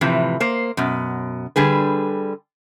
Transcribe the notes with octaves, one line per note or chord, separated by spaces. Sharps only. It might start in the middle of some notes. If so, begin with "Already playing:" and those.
A2 C3 E3 F3
A#3 C5
F#2 B2
D3 G3 G#4 B4